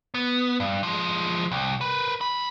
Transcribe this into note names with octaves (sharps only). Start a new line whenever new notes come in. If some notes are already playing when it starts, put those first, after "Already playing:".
B3
G2
F3 G#3
C2
A#4 B4
D2 B5